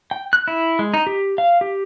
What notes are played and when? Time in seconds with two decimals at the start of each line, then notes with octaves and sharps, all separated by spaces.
0.11 G5
0.33 F#6
0.48 E4
0.79 G#3
0.94 D#4
1.07 G4
1.38 F5
1.61 G4